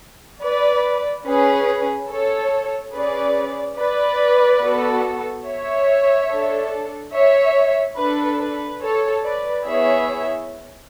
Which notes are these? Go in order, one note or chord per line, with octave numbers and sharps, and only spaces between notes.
B4 D5
C#4 G#4 B4
A4 C#5
C#4 G#4 B4 D5
B4 D5
B3 F#4 A4
C#5 E5
D4 A4
C#5 E5
D4 A4 B4
B4
A4 C#5
B4 D5
B3 E4 G#4 C#5 E5